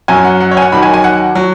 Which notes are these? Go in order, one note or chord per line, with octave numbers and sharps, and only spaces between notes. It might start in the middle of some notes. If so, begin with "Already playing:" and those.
F#2 F#3 G#5
F#5
F#5
C#5
G#5
F#5
D#2 D#3 F#3 B5
G#5
G#5
F#5
F#3